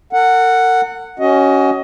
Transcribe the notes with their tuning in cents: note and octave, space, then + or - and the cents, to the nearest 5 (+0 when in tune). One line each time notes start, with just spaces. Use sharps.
A#4 -45 F#5 +0
C#4 +0 F#4 +25 D#5 +20